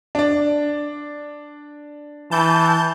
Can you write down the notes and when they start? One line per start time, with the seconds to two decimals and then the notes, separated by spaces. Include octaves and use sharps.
0.15 D4 D5
2.31 E3 A5 G6